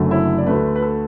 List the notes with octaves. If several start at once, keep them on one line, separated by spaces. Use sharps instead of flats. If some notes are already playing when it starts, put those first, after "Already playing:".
Already playing: F#1 F#2 D3 F#3 A3
E4
D5
D2 D3 A3 B4
B4
A4